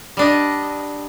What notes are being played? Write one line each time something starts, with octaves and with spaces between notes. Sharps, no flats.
G3 D4 D#5